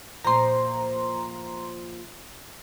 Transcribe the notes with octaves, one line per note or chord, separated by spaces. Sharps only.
A#2 F3 A#5 C6